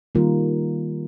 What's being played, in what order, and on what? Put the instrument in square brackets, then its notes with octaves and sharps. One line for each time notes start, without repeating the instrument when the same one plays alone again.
[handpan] D#3 G3 A#3 F4 A#4